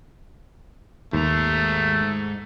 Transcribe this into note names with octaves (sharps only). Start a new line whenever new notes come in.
D#2 G#2 A3 A#5